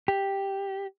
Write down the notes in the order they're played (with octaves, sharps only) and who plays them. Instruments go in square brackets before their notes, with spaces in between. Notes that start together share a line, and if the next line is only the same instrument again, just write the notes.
[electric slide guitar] G4